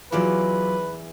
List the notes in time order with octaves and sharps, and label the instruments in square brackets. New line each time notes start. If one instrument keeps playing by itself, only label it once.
[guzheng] E2 E3 D5 [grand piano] F#3 F4 [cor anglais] B4